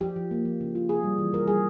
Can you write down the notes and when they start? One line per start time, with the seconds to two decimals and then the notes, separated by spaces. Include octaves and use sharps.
0.01 F3 G4
0.16 F3
0.31 A#3
0.45 F3
0.61 C#3
0.75 F4
0.89 C3 G#4
1.03 G3
1.18 E3
1.33 C3 A#4
1.47 G3 G#4